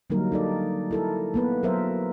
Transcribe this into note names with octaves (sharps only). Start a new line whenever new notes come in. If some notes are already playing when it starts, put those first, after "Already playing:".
D3 F#3 G3 A#3 D#4 A#4
D#4 A4 D5
E4 A4 A#4
A#3 B3 B4
F#3 A#4 C5 E5